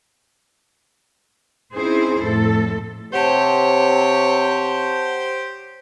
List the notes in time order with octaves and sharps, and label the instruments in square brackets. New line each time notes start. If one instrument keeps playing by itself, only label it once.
[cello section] C4 C#4 D#4 E4 G#4 C5
F2 A2 A3 A4
[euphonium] C3 [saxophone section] G4 C5 [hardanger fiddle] C#5 [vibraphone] F#5 A5